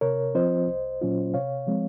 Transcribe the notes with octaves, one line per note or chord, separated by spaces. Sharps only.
C3 A#4 C#5
F3 C4 F4 C5 D#5
C2
A#2 F#3 C#4 F4
C3 C#5 F5
F3 G#3 C4